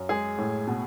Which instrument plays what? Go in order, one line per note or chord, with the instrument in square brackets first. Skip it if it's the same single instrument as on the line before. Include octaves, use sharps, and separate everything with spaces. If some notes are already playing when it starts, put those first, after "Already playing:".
Already playing: [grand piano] F#2
G#3 G#4
A2
B2